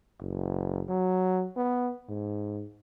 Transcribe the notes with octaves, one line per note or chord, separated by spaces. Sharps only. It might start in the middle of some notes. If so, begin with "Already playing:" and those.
F#1
F#3
B3
G#2